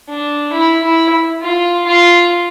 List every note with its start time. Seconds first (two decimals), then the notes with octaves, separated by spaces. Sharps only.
0.09 D4
0.53 E4
0.83 E4
1.42 F4
1.86 F4